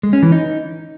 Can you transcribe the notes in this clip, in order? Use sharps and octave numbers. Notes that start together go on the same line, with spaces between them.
G#3
C#4
E3
D#4